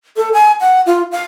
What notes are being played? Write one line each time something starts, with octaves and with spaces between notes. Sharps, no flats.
A4
G#5
F#5
F4
F5